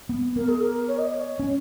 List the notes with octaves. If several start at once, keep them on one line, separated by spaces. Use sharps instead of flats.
B3
B3 A#4
G#4
A#4
C#5
D#5
D#5
C#5
C#4